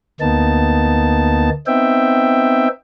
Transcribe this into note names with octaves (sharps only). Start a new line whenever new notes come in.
D2 A#3 B3 D#4 A5
B3 C4 D#4 E5 G5